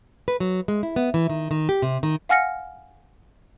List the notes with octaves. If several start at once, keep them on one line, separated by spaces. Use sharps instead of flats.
B4
F#3
G#3
E4
B3
E3
D#3
D#3
G4
C3
D#3
F5 F#5 G#5 F6 A#6 C#7